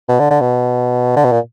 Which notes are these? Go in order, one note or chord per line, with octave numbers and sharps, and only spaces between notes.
B2
D3
D3
B2
D3
B2
A#2